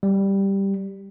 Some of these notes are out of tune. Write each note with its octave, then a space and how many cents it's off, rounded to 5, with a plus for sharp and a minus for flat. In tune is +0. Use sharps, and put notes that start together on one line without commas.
G3 +0